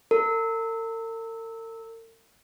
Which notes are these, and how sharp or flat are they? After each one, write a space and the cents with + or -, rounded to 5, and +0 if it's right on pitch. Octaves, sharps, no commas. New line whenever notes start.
A#4 -45